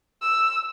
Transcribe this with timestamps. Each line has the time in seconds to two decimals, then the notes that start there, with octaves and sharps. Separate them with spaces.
0.22 E6